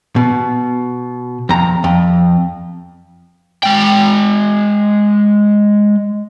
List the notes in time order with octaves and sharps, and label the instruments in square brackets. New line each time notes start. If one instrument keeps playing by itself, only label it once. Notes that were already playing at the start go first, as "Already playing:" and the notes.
[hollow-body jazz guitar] B2
F2 A#5
F2
[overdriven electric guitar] G#3 G5